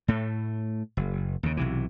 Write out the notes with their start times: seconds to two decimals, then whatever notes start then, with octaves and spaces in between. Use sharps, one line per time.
0.08 A2 A3
0.97 F#1
1.43 D#2 C#3
1.57 B1 C3 E3